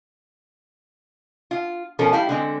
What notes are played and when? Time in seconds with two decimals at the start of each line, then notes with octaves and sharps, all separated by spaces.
1.51 F4
1.99 B2 F3 C#4 A4 A#4
2.13 G3 E4 G4 F5
2.29 D3 G#3 C4